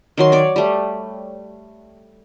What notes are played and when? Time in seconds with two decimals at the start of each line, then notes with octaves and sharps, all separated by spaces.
0.18 D#3 F#3 C6
0.32 C#5 D5
0.56 G3 A3